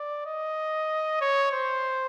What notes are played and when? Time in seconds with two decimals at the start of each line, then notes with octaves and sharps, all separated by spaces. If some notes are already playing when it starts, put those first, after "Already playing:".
Already playing: D5
0.26 D#5
1.21 C#5
1.52 C5